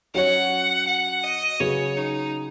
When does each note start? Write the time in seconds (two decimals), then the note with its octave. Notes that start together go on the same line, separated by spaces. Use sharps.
0.14 F#3 C#4 F#4 C#5 F#5
0.87 F#5
1.24 D#5
1.60 C#3 F#3 C#4 G#4 B4 C#5
1.97 D#4